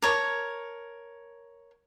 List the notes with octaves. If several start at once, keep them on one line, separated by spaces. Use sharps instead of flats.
A#4 C#5 A5